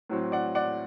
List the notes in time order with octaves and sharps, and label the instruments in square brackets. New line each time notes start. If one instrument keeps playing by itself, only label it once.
[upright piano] A2 F#3 C4
D5 F#5
D5 F#5